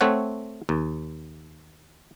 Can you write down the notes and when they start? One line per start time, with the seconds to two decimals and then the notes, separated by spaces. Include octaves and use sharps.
0.01 A3 C4 C#5 F#5
0.69 D#2